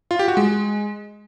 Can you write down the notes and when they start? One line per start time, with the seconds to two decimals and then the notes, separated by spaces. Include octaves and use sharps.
0.11 F4
0.19 G4
0.28 F#4
0.37 G#3